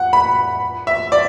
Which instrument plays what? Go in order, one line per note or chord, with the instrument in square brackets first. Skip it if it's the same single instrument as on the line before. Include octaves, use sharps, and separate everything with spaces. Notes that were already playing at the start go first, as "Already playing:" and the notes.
Already playing: [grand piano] F#5
B5
E5
D5